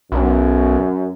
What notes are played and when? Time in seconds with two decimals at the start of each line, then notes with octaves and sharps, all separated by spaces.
0.12 B1 F#2